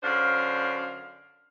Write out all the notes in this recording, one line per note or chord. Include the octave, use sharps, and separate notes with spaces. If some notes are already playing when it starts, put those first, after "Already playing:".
F#2 D3 D4 C5 F5